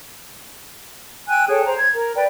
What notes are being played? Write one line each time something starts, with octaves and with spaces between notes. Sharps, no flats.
G5 G#5 E6 F#6
G#4 A4 C#5 G5
C5 A#5
G#6
A#4
B4 D5 G5